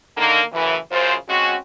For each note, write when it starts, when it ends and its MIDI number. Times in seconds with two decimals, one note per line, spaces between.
0.17 0.41 50
0.17 0.41 51
0.17 0.41 58
0.52 0.76 42
0.52 0.76 45
0.52 0.76 49
0.52 0.76 52
0.92 1.14 42
0.92 1.14 49
0.92 1.14 65
0.92 1.14 72
1.29 1.56 56
1.29 1.56 60
1.29 1.56 61
1.29 1.56 66